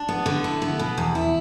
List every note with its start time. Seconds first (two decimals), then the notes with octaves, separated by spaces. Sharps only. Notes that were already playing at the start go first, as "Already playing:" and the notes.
Already playing: D4
0.09 B3
0.26 D3
0.44 E4
0.62 B3
0.79 B2
0.98 E2
1.15 E4